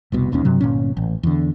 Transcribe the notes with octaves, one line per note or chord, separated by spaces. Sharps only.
F1 C2 B2
E1 D#2 D#3 C#4
G2 C3 F#3
G1 A#2 C#4
A1
E2 D3